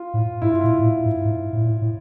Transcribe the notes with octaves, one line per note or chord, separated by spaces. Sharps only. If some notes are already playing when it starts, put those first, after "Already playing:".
Already playing: F4
A2
G#2 E4
F4
A#2 E4
A#2
A2
G#2
G#2
A2
A#2
A2
A2